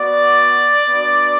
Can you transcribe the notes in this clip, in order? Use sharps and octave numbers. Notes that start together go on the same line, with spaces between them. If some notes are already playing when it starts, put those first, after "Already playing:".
Already playing: B3 F#4 D5
B3 D4 F#4